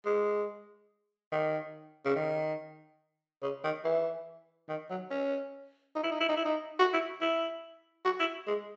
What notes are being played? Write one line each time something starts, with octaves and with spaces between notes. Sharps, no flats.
G#3
D#3
C#3
D#3
C#3
D#3
E3
D#3
F#3
C#4
D#4
E4
D#4
E4
D#4
E4
D#4
F#4
E4
E4
F#4
E4
G#3